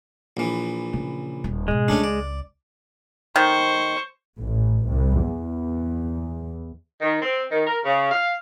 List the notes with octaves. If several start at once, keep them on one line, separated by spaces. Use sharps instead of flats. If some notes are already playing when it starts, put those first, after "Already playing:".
A#1 E3
C#3
D#1
G#2 B2 G#3
C#2 A3 C#4 D4
D5
D#3 C5 C#6
A1
C2
E2
D#3
C4
D#3
A#4
C#3
F5